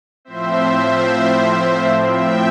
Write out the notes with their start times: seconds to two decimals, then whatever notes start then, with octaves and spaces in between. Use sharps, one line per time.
0.25 A2 F3 C4 C5 E5
2.06 E5 G5